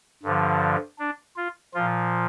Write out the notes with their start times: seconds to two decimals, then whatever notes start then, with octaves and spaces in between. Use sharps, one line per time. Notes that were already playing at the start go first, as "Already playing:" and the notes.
0.23 G2 D3 F3
0.99 D4
1.37 F4
1.74 A#2 F3 F4